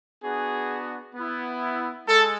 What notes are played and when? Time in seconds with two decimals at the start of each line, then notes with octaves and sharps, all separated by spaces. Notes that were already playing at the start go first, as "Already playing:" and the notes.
0.23 B3 D4 F#4 G#4
1.15 B3 E4
2.08 G#3 A4